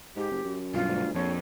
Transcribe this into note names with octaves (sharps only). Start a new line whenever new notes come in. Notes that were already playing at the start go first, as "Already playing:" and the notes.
G#2 G4
F#1
F#2
B1 G2 F4
D2
A#1 F2 C#5